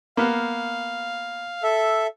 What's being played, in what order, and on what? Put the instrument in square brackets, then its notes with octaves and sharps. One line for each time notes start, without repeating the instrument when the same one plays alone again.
[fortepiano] A#3 B3 [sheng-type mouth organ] F5
[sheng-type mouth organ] A4 E5